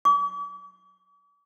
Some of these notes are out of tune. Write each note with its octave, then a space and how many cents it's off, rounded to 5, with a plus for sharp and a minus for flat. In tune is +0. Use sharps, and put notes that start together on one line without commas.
D6 -45